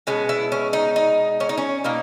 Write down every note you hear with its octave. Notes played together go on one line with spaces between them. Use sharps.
B2 G#3 B3 C#4
E4
C#4
D#4
D#4
C#4
D#4
C#4
B2 A#3 D#4